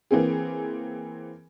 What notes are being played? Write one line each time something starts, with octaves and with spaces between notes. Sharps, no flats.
E3 A#3 C4 G#4